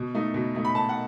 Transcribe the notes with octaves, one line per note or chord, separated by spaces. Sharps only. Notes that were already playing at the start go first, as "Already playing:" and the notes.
Already playing: B2
A3 D#4
B2
A3 D#4
B5
B2 A5
F#5